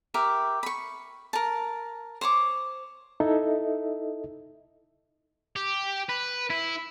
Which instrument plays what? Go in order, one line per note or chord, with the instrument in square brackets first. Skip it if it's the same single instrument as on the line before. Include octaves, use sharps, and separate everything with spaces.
[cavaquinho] G4 A#4 E5
B5 C#6
A#4 A5
C5 C#5 C#6 D6
[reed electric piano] D#4 E4 A4 D#5 E5
[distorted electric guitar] G4
B4
E4